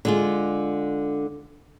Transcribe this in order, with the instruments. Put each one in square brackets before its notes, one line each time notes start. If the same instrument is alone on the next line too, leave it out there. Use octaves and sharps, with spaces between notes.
[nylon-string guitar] D3 G#3 F4